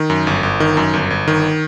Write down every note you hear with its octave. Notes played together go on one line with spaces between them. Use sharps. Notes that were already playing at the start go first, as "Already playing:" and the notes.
Already playing: D#3
F#2
G1
G1
D#3
F#2
G1
G1
D#3